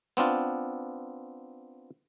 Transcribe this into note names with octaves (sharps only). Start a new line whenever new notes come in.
B3 C4 D4 F4